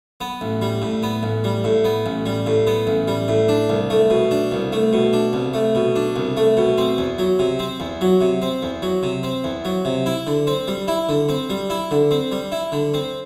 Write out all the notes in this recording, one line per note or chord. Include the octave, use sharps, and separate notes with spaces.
B3
A1
G3
A2
B3
A1
G3
A2
B3
A1
G3
A2
B3
A1
G3
A2
D4
C2
A3
B2
D4
C2
A3
B2
D4
C2
A3
B2
D4
C2
A3
B2
C4
E2
F#3
C3
C4
E2
F#3
C3
C4
E2
F#3
C3
C4
E2
F#3
C3
E4
D3
C4
G3
E4
D3
C4
G3
E4
D3
C4
G3
E4
D3
C4